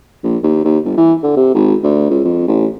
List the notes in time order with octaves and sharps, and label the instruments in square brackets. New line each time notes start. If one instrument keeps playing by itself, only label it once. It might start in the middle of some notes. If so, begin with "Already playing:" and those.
[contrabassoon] A#1
D#2
D#2
G1
E3
D3
C3
G#1
D2
C#2
F2
A1